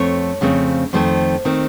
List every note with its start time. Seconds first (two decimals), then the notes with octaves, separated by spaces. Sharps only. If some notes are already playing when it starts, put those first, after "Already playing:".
Already playing: F2 A3 C4 C#5
0.41 F2 C#3 A3 C4
0.93 F2 D#3 A3 C4 C5
1.45 D#3 A3 C4